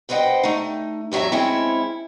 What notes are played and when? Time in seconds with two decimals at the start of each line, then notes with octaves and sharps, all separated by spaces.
0.09 G2 B4 C5 D#5 F#5 G5
0.43 A3 D#4
1.12 E2 A2 F#3 E5 A#5
1.32 G#3 C4 C#4 E4